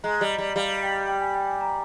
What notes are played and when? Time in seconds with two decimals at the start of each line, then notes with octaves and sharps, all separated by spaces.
0.04 G#3 A#5
0.21 G3 D#5
0.38 G3 D5
0.56 G3 F5
0.83 G5
1.08 G5
1.21 G#5
1.35 G5
1.47 G#5
1.61 A#5